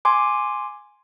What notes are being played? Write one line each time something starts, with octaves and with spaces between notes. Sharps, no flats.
G#5 C6 D6